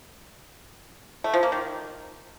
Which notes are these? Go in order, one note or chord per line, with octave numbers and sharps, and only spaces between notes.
A3
F3
A#3
D#3